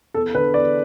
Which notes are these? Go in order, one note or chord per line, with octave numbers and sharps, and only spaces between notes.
E2 A4
D3 B4
E2 D5